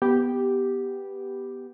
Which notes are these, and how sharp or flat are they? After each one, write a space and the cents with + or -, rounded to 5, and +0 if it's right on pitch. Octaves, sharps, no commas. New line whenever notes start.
B3 +0 G4 +0